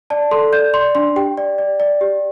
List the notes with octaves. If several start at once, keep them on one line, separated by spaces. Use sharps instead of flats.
D5 A5
A4 C6
D5 G6
D5 C6
D4 C6
G4 G5
D5
D5
D5
G4